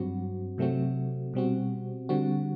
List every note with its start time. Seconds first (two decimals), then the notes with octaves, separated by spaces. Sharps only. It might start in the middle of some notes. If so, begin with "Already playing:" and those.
Already playing: G2 F#3 C4 F#4
0.58 C3 F#3 A3 C4 F#4
1.34 B2 G3 C4 F#4
2.09 D3 G3 C4 F#4